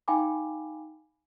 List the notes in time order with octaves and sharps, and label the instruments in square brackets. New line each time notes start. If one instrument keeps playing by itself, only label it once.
[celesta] D#4 F5 G5 G#5 B5 D6